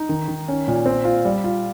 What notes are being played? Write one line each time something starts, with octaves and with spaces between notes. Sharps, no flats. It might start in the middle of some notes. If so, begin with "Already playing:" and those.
Already playing: D#4
D#3
D#3
C#4
A#2
C4
F4
G3
F4